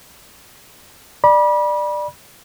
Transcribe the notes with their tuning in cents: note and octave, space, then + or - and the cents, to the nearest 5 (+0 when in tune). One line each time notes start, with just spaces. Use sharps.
D5 +20 B5 -35